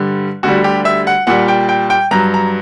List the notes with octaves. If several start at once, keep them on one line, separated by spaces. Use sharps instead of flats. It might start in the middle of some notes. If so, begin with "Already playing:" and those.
Already playing: G2 D3 G3
D2 D3 G3 F#4
G4
E5
F#5
A#2 G3 F#5
G5
G5
G5
G2 F#3 A#5
A#5